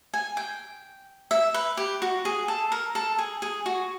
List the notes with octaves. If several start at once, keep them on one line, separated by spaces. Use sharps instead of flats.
G#5
G5
E5
B4
G4
F#4
G#4
A4
A#4
A4
G#4
G#4
F#4